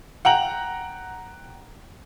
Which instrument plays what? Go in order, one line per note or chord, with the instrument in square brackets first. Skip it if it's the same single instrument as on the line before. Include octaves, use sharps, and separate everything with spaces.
[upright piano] F#5 G5 A#5 F#7